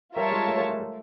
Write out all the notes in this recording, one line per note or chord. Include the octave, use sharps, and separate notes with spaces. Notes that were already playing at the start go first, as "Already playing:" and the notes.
G3 F4 A#4 C#5 E5 A5
G#3
A3
G#3
A3
A3